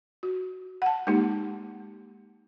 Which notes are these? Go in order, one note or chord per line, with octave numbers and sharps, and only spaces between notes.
F#4
F#5 A5
G#3 A#3 D#4 G4